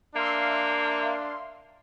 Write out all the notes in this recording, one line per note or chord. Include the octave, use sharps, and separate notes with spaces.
A#3 D4 E5 F5 C6